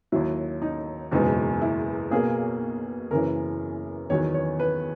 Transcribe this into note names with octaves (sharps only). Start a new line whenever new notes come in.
D#2 D#3 F#3 E4
D#4
F#1 E2 B2 G#3 D#4
E4
B1 B2 A#3 G#4
F#1 F#2 E3 A#4
E2 D#3 F#3 B3 C#5
C#5
B4